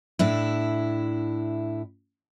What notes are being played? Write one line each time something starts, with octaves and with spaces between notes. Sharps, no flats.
A2 D4 E4